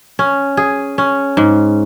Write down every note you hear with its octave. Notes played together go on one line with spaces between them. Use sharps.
C#4
G#4
C#4
G#2